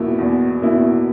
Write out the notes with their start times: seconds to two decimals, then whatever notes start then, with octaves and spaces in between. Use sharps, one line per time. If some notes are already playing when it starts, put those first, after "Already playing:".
Already playing: E2 B2 A#3 E4
0.18 E2
0.62 B2 A#3 E4